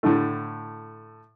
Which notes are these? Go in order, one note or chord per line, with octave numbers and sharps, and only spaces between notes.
A2 D3 A3